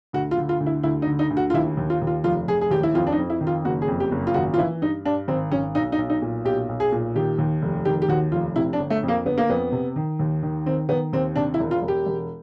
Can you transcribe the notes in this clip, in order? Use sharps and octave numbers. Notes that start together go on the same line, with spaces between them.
D2 F#4
F4
D3
F4
D2
E4
D2 E4
D#4
D3
D#4
D2
F#4
F4
D#2 E4
D#2
F4
D#2
F4
F1 F4
F1 G#4
G#4
D#2 G4
E4
F2 F4
D4
D#4
F2
E4
D#3
F4
F#1 F#4
G#4
F2
G4
F#1
F4
G#1 F#4
F4
E3 E4
G2 D#4
G2 D4
G#1 C4
G#1 C#4
B1 D#4
D#4
B1
D#4
A#2
B1 G4
B1
G#4
A#2
D#3 G4
D#2
F1
D#3 G4
G4
D#2 F#4
F1 F4
C3 E4
D4
G1
A3
F2
A#3
G1 B3
A#3
F2 B3
C3
D#3
D#2
D#3
D#3 C4
D#3 B3
D#2 C4
C3 D4
E4
E1
F4
E1
G4
E1